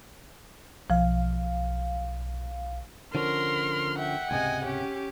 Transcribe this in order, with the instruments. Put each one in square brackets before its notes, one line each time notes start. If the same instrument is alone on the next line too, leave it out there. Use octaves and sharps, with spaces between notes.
[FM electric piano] B1 F5 [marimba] F3
[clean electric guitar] D3 F3 C#4 [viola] A#4 [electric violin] C6 F6
[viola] E5 [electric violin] F#5 G5
[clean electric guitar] C#2 G#2 C3 [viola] D#5 G#5
[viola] C#4 G4